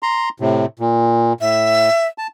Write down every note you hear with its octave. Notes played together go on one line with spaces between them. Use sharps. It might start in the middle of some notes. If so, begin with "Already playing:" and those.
A#5 C6
A2 C3
A#2
A2 E5
A5